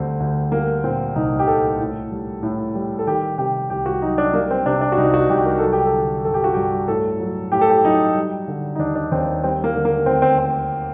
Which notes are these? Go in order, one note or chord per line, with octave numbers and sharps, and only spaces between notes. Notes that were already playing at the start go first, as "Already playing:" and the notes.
Already playing: D2 D3 G3 C4
D2
G3 A#3
A#2 C4
C2 D#4
G4
C2 A4
A2
G3
A2
G3
A4
D#3 G4
C3 G4
C2 G4
F#4
F#3 D#4
D4
G3 A#3
C4
C3 D4
D4
F#4
C2 D#4
F#4
C2 G4
A#4
F#3 A4
G4
A4
D3
G2 A4
G4
F#4
G2 G4
A2 A4
F#3
A2 G4
A4
G4
F#3 D#4
G3
D3
D#4
D#2 D4
D4
D#2 C4
G3 C4
A#3
D3
A#3
D2 C4
C4
C4